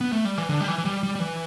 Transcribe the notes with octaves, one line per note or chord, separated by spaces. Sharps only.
B3
A3
G3
E3
D3
G3
E3
E3
G3
G3
G3
E3